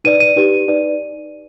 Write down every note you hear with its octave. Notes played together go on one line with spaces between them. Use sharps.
D#4 B4 D5 D#7
D#7
D#4 G4 B4
D#4 B4 D5